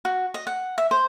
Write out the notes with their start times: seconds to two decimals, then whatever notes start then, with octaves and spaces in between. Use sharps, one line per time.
0.05 F#4
0.34 D#5
0.47 F#5
0.78 E5
0.91 C5